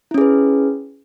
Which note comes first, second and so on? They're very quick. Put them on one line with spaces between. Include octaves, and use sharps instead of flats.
E4 C#4 G#4 B4